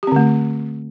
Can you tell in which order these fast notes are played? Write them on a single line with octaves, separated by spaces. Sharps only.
G4 C4 D3 A3